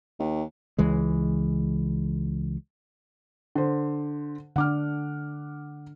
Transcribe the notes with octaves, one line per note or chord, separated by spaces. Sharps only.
D#2
C#2 E3 G#3
D3 C5
D3 D4 F#5 D6 F6